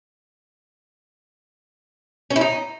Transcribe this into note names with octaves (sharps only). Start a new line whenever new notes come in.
C#4
E4
D#4